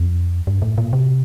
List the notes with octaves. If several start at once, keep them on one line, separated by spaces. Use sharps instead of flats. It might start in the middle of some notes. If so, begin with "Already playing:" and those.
Already playing: F2
G2
A2
A#2
C3